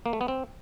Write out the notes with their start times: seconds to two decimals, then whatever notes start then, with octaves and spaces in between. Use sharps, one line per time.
0.06 A#3
0.13 A3
0.21 B3
0.28 C4